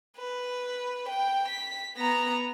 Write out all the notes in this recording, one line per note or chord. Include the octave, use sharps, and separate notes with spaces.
B4
G5
B6
B3 A#5